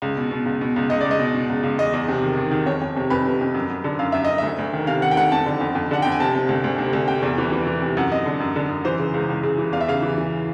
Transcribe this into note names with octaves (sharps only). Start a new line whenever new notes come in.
C#2
B2
B2
C#2
B2
C#2
C#2 D#5
C#2 D5
D#5
B2
B2
C#2
C#2
E2 D#5
E2
C3
D#3
D#3
D#3
F2 C#5
F2
C3
F2 B4
C3
F2
F#2
F#2
D3
F#2 F5
F#2 E5
F#2 D#5
D2 E5
D2
D#3
C3 F5
D#3 F#5
G5
D2 F#5
F2 A5
D3
F2
F2
D3 F#5
F2 G5
G#5
C3 A5
C3
D2
D2
C3
D2
C3 G5
E2
E3
E3
E3
C3
F#2 F#5
F#2 D#5
D3
F#2
D3
F#2
E3 C5
C#3
C#2
C#2
C#3
E3
E2 F5
E5
C#3 F5
E3
E3